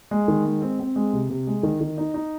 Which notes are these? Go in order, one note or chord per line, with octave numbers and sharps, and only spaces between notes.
G#3
D#3
G#3
C4
C4
G#3
C3
C3
G#3
D#3
D#3
D#4
D#4